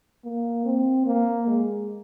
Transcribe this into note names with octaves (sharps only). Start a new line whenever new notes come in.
A#3
C4
A#3
G#3